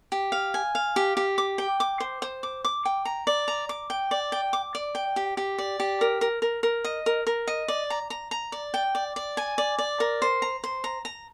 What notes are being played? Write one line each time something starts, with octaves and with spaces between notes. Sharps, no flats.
G4
F5
G#5
F5
G4
G4
D6
G5
D6
C5
C5
D6
D6
G5
A#5
D5
A#5
D6
G5
D5
G5
D6
D5
G5
G4
G4
D5
G4
A#4
A#4
A#4
A#4
D#5
A#4
A#4
D#5
D5
A#5
A#5
A#5
D5
G5
D5
D5
G#5
D5
D5
A#4
C5
A#5
C5
A#5
A#5